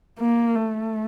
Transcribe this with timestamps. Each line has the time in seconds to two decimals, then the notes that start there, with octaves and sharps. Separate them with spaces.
0.20 A#3
0.56 A3